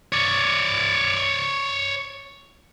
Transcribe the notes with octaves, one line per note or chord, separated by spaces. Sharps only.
C#5 D5